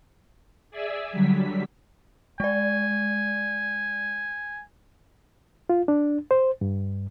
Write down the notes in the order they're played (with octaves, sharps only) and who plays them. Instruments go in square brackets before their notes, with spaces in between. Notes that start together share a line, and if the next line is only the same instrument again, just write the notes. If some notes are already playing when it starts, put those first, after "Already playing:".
[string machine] G#4 D5 E5 G#5 E6
D3 F#3 G3 B6
[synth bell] G#3 D5 [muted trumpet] G#5
[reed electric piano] F4
D4
C5
G2